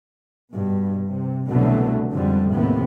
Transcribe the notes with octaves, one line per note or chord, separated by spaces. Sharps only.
G2 B2
C3
C2 B2 D3 E3 F#3 A3
F2 G#2 D3 G3
F1 D#2 A2 C3 B3